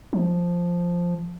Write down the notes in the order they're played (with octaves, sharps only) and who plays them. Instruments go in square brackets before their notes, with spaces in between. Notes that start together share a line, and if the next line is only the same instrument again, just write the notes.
[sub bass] F3